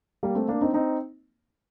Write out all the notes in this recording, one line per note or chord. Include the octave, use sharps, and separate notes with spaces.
G3 A#3
A3 C4
A#3 D4
C4 D#4
C4 D#4